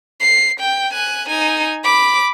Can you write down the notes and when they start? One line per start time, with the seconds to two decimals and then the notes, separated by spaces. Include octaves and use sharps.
0.20 C7
0.60 G5
0.93 G#5 F#6
1.29 D#4 G#5
1.84 B5 D6